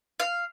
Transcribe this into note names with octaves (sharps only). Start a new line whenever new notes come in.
F5